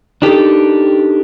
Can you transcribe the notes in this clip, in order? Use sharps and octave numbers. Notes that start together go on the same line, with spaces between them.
D4 D#4 G4 A4 A#4